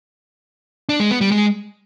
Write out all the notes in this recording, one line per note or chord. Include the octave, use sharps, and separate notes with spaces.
D4
G#3
B3
G3
G#3